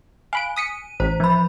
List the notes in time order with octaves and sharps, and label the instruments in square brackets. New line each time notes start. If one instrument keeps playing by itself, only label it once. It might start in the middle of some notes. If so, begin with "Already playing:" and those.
[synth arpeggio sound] F5 B5 D7 [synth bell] G#5
[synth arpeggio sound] D#6 B6 C#7 [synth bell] D#7
[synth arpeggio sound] A1 [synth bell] C5
[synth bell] F3 B5